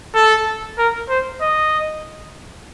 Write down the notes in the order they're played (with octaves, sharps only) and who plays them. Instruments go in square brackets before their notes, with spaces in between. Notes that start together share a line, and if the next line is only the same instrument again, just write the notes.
[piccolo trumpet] A4
A#4
C5
D#5